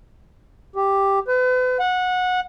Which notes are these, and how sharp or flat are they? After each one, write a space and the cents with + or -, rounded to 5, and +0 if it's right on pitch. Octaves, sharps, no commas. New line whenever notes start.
G4 +5
B4 +40
F#5 -20